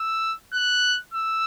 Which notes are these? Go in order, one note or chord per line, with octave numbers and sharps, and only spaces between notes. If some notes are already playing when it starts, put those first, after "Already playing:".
Already playing: E6
F#6
E6